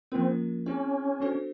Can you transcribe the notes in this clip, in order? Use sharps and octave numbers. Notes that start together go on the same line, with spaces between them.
F3 A#3 C4 C#4 F4 A#4
C4 C#4 E4 G#4 C#5
B3 D4 F#4 A4 C5